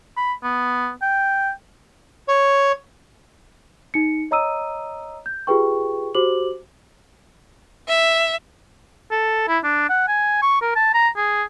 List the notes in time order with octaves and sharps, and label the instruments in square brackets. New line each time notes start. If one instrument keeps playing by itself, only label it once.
[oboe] B5
B3
G5
[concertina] C#5
[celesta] D#4 C#7
C#5 D#5 A#5 D#6 E6 D#7
G6
F4 G4 G#4 B4 G5 C#6
F#4 G4 C5 D6 F#7
[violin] E5
[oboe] A4
E4
D4
F#5
G#5
C#6
A#4
A5
A#5
G#4